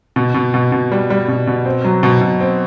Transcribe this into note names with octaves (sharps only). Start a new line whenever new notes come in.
B2
B2
B2
B2
G3
G3
B2
B2
C4
F#3
B2
B2
C4